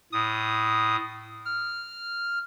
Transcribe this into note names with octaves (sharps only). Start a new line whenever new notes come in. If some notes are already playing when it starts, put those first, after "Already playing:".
A2 D#6
F6